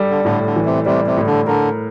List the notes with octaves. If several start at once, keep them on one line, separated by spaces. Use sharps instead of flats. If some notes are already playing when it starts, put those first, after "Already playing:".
Already playing: G3 D4 A4
D3
A2 D3
D3
E3
C3
C3 G3
C3
A2
D3
D3 A#4